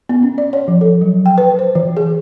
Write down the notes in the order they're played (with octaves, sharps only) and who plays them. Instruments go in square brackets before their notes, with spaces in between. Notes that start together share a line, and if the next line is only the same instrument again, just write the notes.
[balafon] B3
C#4
D5
C#5
F3
A4
F#3
G5
B4
C5
E3
G#4